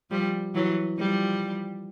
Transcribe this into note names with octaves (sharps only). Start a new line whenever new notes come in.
F3 G3
E3 F#3
F3 G3